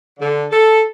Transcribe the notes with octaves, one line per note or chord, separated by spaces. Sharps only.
D3
A4